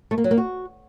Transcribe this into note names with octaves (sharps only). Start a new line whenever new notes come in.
A3
A#3
F#3
A#3
F#4